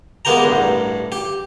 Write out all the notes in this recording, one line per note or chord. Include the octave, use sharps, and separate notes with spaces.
G#3 A#3 B3 G4 G5 A#5
A1 G2
G4